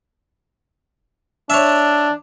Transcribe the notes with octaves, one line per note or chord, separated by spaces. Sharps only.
D4 C#5 E5